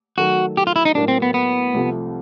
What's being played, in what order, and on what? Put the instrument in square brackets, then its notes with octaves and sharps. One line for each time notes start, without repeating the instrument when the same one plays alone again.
[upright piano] D#3 F#3 A3 [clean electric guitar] F#4
[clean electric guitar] G4
F4
E4
D#4
[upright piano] A2 F#3 A#3 [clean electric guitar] D4
[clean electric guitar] C4
B3
B3
[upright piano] C2 C3 F3 A3